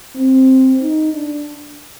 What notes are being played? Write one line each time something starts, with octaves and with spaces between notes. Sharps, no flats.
C4
D#4
D4